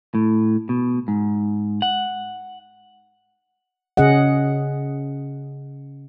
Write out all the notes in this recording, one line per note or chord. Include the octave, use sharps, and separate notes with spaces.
A2
B2
G#2
F#5
C#3 C#4 G#4 D#5 F#5